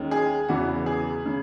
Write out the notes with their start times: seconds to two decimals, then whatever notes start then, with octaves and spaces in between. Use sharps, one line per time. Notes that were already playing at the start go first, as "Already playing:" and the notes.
Already playing: D#2 D#3 G#3 C#4
0.11 G#4
0.48 E2 C#3 E3 B3 F#4
0.86 G#4
1.26 C#3